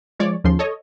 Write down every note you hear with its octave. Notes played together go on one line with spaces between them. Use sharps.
F3 G#3 C#5 D5
D#2 C#3 F3 C6
A4 C#5 D#5